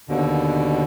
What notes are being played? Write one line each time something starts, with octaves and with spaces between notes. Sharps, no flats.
D#2 B2 D3